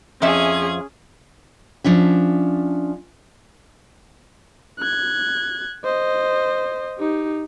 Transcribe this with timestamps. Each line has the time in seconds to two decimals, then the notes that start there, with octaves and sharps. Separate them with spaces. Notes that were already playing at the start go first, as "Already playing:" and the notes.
0.22 F2 F3 C#4 G#4 E5 G#6
1.84 F3 C#4 D4 E5
4.79 F#6 G#6
5.84 C5 D#5
6.98 D#4 G4